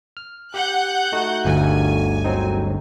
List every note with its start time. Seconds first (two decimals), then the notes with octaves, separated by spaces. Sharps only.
0.17 F6
0.54 G4 F#5 F#6 G6
1.12 A3 D#4 F#4
1.45 G1 D2 G2 G#5
2.24 F#3 C4 D#4